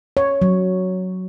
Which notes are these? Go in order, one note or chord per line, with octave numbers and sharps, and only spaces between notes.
C#5
F#3